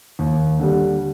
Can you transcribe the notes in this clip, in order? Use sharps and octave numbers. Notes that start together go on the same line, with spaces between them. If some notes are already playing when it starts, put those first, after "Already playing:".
D#2
D3 G3